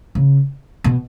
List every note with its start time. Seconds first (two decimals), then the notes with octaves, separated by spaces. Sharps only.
0.15 C#3
0.84 B2